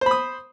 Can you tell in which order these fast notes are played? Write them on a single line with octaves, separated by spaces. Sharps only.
C5 B5 D#6